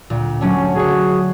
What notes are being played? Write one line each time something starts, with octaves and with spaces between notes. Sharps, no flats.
D2 A#2
F#3 A3 C#4 D4
D3 F#4 G#4 C#5